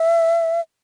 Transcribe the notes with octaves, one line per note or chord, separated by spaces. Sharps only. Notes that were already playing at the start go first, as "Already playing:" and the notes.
Already playing: E5